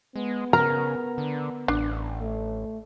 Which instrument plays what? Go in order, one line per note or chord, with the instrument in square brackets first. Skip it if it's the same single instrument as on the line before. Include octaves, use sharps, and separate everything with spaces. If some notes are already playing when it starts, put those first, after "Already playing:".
[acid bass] G#3 [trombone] B3
[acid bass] C#3 [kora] A#4 [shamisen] A#5
[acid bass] D3
[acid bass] A1 [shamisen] D4
[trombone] A3